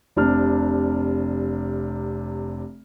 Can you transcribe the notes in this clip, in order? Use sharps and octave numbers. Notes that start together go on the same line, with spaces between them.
F1 C3 D4 F6